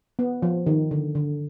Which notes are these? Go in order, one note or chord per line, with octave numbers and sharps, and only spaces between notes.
B3
F3
D#3
D3
D3